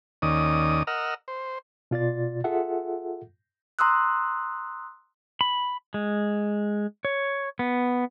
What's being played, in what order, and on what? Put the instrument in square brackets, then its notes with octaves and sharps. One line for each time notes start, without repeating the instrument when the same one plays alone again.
[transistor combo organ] D#2 D#3 C#4 D5 D#6
A#4 D#5 F#5 E6 F6
C5
[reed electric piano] B2 F4 D5 A6
F4 G#4 A4 E5 F#5
[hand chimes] A#5 C6 D#6 E6 F#6
[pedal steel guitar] B5
G#3
C#5
B3